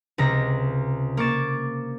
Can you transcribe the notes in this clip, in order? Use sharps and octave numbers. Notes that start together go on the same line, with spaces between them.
C#2 C3 A#5 A#6
A#3 C#6 D6 A6 E7